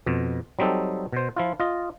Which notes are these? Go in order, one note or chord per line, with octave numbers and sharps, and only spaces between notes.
F2 B2
F#3 G3 C4 D#4 A4
B2 C5
F3 E4 F4
F4 D#5